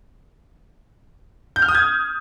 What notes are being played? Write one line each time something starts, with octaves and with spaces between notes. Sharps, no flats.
G6
F6
D#6
G#6